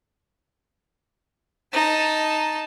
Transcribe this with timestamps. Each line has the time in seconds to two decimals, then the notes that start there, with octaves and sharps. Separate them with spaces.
1.73 D#4 A5